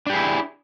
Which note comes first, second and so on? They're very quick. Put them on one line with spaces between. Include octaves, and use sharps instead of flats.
D4 G4 G#4 E4